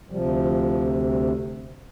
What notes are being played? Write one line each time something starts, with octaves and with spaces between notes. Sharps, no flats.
D2 C3 F3 G3
F3
G3